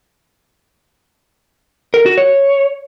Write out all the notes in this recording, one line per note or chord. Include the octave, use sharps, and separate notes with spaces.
A#4
F#4
C#5